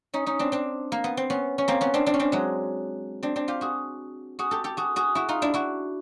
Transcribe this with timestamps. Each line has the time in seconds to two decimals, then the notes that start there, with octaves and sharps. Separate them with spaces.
0.14 C#4 D#4
0.26 C#4 D#4
0.39 C4 D4
0.52 C4 D4
0.92 A#3
1.04 B3
1.17 C4
1.30 B3 C#4
1.58 C#4
1.68 A#3 C4
1.81 B3 C#4
1.94 C4 D4
2.06 C4 D4
2.14 C#4
2.19 C4 D4
2.32 F#3 G#3
3.23 C4 D4
3.36 C4 D4
3.48 F4 G4
3.61 F#4 G#4
4.39 F#4 G#4
4.51 G4 A4
4.64 G4 A4
4.77 F#4 G#4
4.96 F#4 G#4
5.15 E4 F#4
5.29 D#4 F4
5.42 D4 E4
5.54 E4 F#4